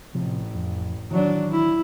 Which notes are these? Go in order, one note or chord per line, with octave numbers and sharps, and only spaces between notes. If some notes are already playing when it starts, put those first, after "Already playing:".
A1 C3 F3
F2
D#3 E3 F#3 D4
E4